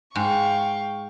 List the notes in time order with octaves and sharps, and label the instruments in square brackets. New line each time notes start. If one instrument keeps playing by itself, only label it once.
[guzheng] G#2 [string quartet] F5 G5 C#6